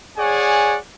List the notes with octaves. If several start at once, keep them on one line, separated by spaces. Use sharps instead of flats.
G#4 C#5 D5 F#5 G#5